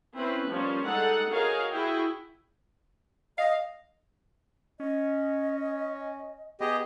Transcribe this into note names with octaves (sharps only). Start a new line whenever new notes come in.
C4 C#4 E4 B4
F3 G3 A#3 C#4 F4
G3 G#3 D#4 A4 F#5
D#4 F#4 G#4 A#4 C#5 F5
E4 F#4 G#4 G5
D#5 F5
C#4 D#5
B3 G4 G#4 D#5